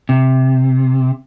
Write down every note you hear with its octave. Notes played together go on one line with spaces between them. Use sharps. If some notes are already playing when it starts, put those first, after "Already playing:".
C3